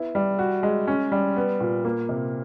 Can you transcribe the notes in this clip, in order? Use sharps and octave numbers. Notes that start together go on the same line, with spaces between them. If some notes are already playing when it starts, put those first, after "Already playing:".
Already playing: B3 E4
G3
F#4
G#3
C#4
G3
B3
A#2
A#3
C3